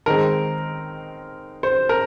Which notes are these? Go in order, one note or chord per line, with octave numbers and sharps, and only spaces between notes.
D#3 G#3 C4 A#4
C5
A#4